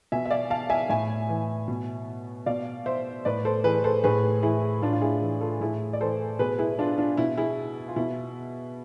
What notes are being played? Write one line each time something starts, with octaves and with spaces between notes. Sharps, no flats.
B2 E5 G#5
E5
D5 F5
F5 A5
E5 G#5
A2 E5 G#5
E3
B2
B2 D5 F5
C5 E5
A2 B4 D5
A4 C5
E3 G#4 B4
A4 C5
A2 G#4 B4
E3 E4 G#4
A2 D4 F4
F4
E4 G#4
E3
F4 A4
A2 E4 G#4
D5
E3 A4 C5
B2 G#4 B4
E4 G#4
D4 F4
D4 F4
B2 E4
E4 G#4
F4
B2 E4